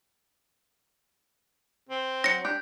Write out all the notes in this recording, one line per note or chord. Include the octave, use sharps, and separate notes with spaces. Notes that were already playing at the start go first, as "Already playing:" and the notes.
C4
F#3 A#6 C#7
D4 G4